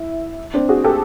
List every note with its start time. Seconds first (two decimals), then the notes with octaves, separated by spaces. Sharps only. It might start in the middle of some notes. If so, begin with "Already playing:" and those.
Already playing: E4
0.54 C4 D4
0.69 F#4 G#4
0.84 G4 A4